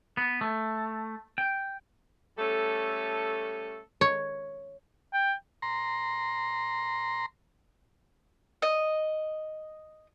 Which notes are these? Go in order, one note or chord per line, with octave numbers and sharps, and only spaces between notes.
B3
A3
G5
G3 A3 C#4 A4
C#5
G5
A#5 C6
D#5